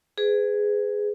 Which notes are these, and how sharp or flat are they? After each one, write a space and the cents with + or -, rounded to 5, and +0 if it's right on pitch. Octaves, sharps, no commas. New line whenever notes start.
G#4 +0 B4 +35